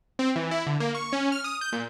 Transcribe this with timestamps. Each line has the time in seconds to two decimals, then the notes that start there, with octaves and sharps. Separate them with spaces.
0.19 C4
0.36 E3
0.51 E4
0.67 D3
0.80 A#3
0.95 C#6
1.13 C#4
1.32 F6
1.44 D#6
1.61 G6
1.73 A#2